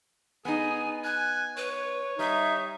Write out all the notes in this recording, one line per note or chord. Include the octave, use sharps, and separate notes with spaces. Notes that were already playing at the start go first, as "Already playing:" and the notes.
B3 D#4 G#4 G#5
G#5 F#6
B4 C#5
G3 D#4 E5